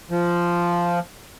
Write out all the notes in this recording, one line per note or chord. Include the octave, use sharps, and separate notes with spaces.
F3